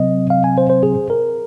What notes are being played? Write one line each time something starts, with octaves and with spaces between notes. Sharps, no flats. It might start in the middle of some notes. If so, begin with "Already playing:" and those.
Already playing: C3 F#3 C4 D#5
F5
G#5
C5
C5
G#4
A#4